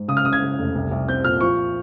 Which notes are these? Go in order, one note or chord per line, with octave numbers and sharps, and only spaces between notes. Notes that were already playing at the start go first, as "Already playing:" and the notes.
Already playing: G#2
C#3 D#6
F6
C#3 D#6
G#6
C#3
F1
C2
C2
C4 G6
A#2 F6
F3 C#6